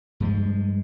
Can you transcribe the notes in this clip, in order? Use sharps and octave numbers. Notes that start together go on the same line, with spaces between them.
G2 F3 G#3